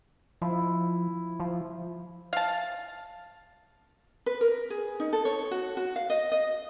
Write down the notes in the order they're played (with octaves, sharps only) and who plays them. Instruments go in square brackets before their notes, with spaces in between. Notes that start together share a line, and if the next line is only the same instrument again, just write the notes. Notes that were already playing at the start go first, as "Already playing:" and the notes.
[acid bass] F3 [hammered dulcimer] E4
[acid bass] F3
[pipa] F5 A5
[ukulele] B4
A#4
G#4
D#4
A4
C#5
F#4
F#4
F5
D#5
D#5